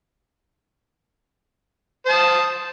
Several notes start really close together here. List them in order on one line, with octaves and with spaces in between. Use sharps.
C5 A5 D#6